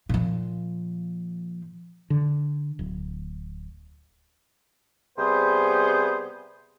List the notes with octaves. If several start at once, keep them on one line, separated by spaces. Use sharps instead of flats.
A#2 F3
D3
D1
C3 G3 B3 G#4 B4 C5